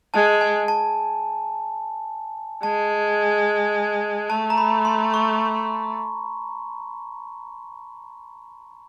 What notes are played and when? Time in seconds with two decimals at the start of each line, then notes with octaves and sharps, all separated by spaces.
0.14 G#3 A5
0.41 G#5
0.68 A5
2.63 G#3 A5
4.29 A3 A5
4.50 A#5
4.58 B5
4.85 C6
5.14 C#6